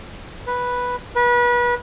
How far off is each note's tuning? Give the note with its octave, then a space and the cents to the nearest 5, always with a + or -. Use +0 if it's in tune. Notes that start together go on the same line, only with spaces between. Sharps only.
B4 -5
B4 -30